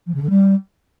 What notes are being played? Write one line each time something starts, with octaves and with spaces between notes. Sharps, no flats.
F3
C#3
D3
G3